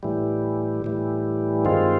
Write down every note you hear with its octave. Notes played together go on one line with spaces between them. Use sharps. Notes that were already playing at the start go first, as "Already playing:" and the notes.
A2 E3 G3
A2 E3 G3
G2 D#3 G#3 C4 F4